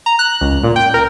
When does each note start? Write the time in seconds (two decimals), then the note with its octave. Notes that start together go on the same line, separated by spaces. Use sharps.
0.06 A#5
0.19 F#6
0.41 C#2
0.64 A#2
0.76 G5
0.94 A#4